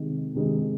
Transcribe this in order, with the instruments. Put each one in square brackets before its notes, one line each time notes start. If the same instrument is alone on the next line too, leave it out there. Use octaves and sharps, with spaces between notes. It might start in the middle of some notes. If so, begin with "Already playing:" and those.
Already playing: [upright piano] C3 D#3 G#3 D#4
C3 D#3 G#3 D#4